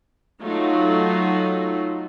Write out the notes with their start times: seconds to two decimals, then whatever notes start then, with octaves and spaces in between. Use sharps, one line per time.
0.42 F#3 A3 D#4 F4